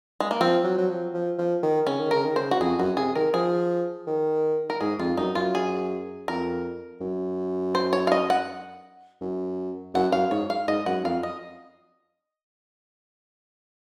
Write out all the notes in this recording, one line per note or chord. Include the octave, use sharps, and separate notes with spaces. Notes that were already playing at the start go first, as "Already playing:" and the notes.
G#3
A#3
F3 C4
F#3
F#3
F3
F3
F3
D#3
C#3 C#4
D#3
C#3 A#4
D#3
C#3 C5
F#4
F2 G#4
F#2 F#4
C3 G#4
D#3 A#4
F3 G#4
D#3
A#4
G#2 G#4
F2 F4
F#2 D#4
F#2 F4
G#4
F2 A#4
F#2
C5
C#5
F5
D#5
F#5
F#2
F#2 F#5
F#2 F5
G#2 C#5
F5
G#2 D#5
F#2 F#5
F2 F5
D#5